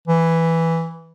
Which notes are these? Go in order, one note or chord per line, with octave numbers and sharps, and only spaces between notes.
E3